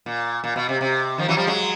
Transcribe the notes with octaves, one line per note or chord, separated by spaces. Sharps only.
A#2
A#2
B2
C3
C3
D#3 F3
E3 F#3
F3 G3
F#3 G#3